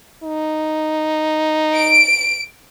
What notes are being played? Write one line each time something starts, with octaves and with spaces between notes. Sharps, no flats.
D#4
D7